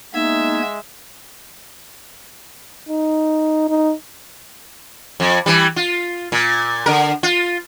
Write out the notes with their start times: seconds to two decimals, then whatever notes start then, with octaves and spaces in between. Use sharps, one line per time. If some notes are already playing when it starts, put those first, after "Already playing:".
0.14 G#3 A#3 B3 D#4 E5 G#6
2.89 D#4
3.69 D#4
5.20 F2
5.46 E3 G3
5.76 F4
6.32 A#2
6.86 D3 A#4
7.23 F4